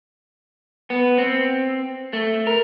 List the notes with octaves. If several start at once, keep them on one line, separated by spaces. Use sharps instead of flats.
B3
C4
A3
A#4